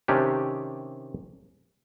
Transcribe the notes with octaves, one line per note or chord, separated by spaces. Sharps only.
C3 D#3 C#4 D4 G4